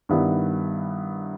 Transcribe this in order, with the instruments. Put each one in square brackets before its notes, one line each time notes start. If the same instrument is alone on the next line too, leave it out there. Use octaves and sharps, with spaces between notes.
[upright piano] G2 D#3 G3 B3 E4